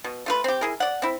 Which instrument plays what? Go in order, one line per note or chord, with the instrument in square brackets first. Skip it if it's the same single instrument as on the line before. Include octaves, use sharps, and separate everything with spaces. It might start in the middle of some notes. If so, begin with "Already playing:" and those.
[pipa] B2
A3 F4 B4
C4 G4
E4 G#4 A#4
D5 F#5
C4 E4